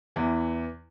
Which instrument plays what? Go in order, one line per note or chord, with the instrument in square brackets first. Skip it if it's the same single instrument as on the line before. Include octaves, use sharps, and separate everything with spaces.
[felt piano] E2 E3